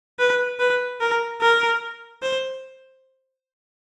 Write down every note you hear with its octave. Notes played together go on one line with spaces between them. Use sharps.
B4
B4
A#4
A#4
C5